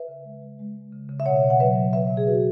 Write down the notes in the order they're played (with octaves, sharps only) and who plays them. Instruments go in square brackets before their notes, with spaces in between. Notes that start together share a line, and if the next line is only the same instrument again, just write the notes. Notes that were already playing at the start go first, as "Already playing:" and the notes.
Already playing: [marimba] B4 E5
C#3
G#3
G#3
G#3
G#3
C#3
C#3
E5
B2 C#5 F#5
B2
F#5
F#3 B4 E5
F#3
B2 B4 E5
B2
G#4
B2 F#4 B4